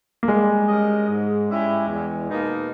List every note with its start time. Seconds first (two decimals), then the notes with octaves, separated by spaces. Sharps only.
0.23 A#3
0.28 G3 G#3
0.68 C#4 G4 A#4 D#5
1.08 G#2
1.47 G3 C#4 E4 G4
1.88 E2
2.28 B2 A#3 D#4